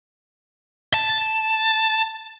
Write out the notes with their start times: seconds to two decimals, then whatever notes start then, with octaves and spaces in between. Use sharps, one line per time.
0.94 A5